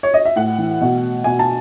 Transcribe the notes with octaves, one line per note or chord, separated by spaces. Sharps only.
C#5
D#5
E5
A2 F#5
E3
B2
B2 G#5
A5